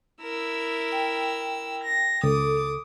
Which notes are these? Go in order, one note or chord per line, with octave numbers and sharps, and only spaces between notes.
E4 A#4 E6
G5
A#6
C#2 A4 D6 D#6